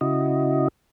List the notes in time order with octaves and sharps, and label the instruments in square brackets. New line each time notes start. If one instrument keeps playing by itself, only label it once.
[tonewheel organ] C#3 E4 F#4 D#5